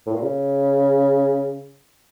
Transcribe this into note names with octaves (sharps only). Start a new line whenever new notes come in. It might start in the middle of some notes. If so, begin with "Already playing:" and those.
A2
A#2
C#3